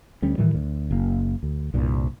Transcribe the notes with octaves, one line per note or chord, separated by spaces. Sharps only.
D2 G3 C#4
A2 D#3 E3 G3
D2
F#1 A#3
D2
C2 G2 A#2